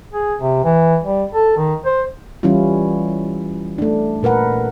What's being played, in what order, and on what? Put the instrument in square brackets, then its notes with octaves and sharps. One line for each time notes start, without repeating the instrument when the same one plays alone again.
[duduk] G#4
C3
E3
G3
A4
D#3
C5
[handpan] E3 G3 C#4 E4 F4
A3 D4
A#2 A#4 B4 F#5